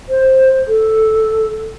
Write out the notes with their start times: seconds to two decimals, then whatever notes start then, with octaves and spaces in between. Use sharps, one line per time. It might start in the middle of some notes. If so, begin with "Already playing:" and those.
0.09 C5
0.68 A4